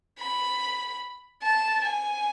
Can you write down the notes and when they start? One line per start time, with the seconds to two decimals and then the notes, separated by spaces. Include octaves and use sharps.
0.19 B5
1.42 A5
1.84 G#5